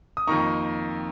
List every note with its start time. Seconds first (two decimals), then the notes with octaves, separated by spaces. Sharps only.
0.17 D#6
0.27 F2 D#3 A#3 D#4 A#5 C#6